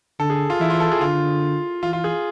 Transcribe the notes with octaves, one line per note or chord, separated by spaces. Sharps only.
D3 A4
G#4
F4
E3 E4
F4
A4
G#4
D3 F4
E3 F4
F4
G#4